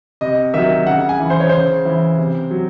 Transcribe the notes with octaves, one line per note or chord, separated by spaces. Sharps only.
C3 D#5
D#3 F#3 E5
C#3 F#5
G#5
E3
C5
C#5
C#3 C5
E3
C3
F#3